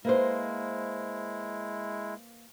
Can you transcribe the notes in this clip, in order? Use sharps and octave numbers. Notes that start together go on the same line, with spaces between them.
G#3 A#3 E4 B4 C5